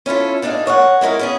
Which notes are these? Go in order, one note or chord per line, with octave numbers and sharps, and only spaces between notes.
C#4 E4 F4 A4
A2 D4 D#4 G#4 F5
A#4 C#5 F5 F#5
G#3 E4 A#4 F5
B3 C#4 G#4